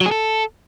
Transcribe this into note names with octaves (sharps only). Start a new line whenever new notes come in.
F#3
G#4
A4